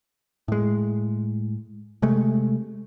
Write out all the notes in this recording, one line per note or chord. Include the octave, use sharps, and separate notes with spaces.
A2 G#3
C3 G#3 A3